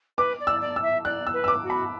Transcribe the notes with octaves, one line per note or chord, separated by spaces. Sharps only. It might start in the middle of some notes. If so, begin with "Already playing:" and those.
B4 D6
D5
E6
D5
E6
E5
D5 F#6
E6
B4
E6
D6
F#4
B5